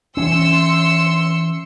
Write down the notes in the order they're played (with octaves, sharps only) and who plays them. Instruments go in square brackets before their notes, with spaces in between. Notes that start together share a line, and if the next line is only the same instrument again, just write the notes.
[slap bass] E3 C#4 [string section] C6 E6 C#7